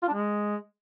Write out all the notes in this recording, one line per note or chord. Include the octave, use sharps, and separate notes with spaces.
F4
D4
G#3